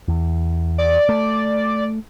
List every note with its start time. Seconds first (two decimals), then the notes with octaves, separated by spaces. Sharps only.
0.08 E2
0.78 D5
1.09 A3